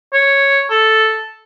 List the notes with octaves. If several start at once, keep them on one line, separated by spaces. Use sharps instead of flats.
C#5
A4